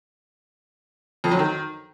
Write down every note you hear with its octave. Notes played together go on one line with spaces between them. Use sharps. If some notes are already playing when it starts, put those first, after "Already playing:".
F2
F#3
D#3